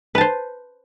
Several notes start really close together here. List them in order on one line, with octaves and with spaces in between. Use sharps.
B4 A5 C5